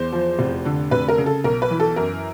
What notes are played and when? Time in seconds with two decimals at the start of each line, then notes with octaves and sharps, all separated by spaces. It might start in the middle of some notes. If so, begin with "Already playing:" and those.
Already playing: E2 C5
0.12 F3
0.39 F1
0.65 D3
0.91 F1 B4
1.08 A#4
1.18 C#3
1.26 A4
1.44 B1 A#4
1.62 B4
1.70 E3
1.80 A4
1.96 F#2 A#4